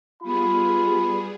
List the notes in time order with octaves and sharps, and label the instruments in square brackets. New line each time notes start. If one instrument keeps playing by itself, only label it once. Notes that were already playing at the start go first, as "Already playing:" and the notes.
[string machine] G3 B3 G#4 [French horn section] F4 [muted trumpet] B5